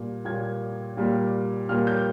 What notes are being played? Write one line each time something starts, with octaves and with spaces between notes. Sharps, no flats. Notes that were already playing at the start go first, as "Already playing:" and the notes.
Already playing: A#2 G3 A#3
A#2 G3 A#3 G#6
A#2 G3 A#3
A#2 G3 A#3 F6
G6